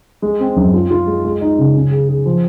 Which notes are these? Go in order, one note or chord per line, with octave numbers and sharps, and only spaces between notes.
G#3
C4
F#2
F4
F4
G#3
G#3
D#4
C#3
C#4
G#4
G#4
F3